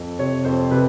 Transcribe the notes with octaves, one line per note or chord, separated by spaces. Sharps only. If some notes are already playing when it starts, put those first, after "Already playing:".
Already playing: F2
C3 C#5
F2 C5
C3 B4